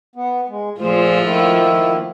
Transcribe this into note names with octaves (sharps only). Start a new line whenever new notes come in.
B3
G#3
A#2 F3 A3 F4 G#4 C5
D#3 A#3 E4